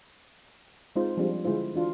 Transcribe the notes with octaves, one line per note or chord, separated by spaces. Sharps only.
G#3 C4 D#4 F4 C5
F3 G3 G#3 C4 D4 F4
D3 G#3 E4 F4 C5
E3 D4 F4 F#4